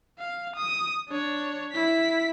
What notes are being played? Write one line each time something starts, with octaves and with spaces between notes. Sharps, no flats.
F5
D#6
D4 C#5
E4 B6